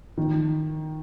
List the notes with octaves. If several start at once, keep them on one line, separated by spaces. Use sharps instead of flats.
D#3